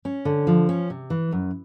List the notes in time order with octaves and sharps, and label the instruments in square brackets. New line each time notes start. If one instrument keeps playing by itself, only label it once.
[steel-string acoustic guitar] C#4
D3
F3
C#4
C3
E3
F#2